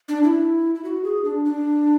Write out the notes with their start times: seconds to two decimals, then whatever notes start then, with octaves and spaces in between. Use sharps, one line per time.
0.08 D4
0.24 E4
0.75 E4
0.84 F#4
1.04 G#4
1.25 D4
1.45 D4